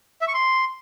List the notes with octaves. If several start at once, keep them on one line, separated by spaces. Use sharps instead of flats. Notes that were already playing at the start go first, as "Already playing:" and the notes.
E5
C#6
C6